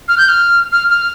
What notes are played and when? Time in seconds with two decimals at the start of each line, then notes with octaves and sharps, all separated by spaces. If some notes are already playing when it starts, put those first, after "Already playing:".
0.08 F6
0.18 G6
0.28 F6
0.72 F6
0.89 F6